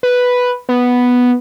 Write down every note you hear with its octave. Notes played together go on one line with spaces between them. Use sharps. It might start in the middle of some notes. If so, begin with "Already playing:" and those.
B4
B3